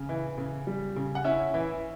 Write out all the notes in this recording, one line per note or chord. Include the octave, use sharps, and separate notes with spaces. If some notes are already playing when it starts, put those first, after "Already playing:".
Already playing: C#3
E3
C#3
G3
C#3
F#5
C#4 E4 E5
E3